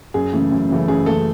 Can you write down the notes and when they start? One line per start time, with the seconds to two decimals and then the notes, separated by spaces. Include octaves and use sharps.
0.14 F#2 G#4
0.33 C#3 E3 A3
0.52 F#2
0.70 C#3 E3 A3
0.88 F#2 G#4
1.06 C#3 E3 A3 A4